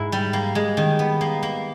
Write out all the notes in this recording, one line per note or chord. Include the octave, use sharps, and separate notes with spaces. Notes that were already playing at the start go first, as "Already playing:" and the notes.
Already playing: G#2 E4
G3
A#3
G#3
D#3
B3
A#3
A#3